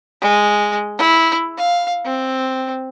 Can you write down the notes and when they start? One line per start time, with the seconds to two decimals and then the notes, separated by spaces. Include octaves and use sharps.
0.21 G#3
0.98 E4
1.57 F5
2.05 C4